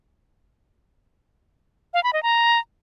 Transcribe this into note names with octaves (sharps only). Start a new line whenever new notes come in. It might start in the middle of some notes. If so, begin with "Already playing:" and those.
F5
B5
D#5
A#5